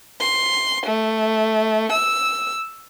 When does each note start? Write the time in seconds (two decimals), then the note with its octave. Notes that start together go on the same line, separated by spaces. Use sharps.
0.20 C6
0.86 A3
1.92 E6